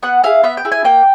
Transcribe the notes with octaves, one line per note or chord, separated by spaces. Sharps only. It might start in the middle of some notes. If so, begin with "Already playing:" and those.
B3 F#5
E4 G#4 F5
B3 E5
G5
E4 G#4
G#5
A#3 G5